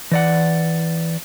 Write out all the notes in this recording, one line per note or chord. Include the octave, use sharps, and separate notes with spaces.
E3 D5 F#5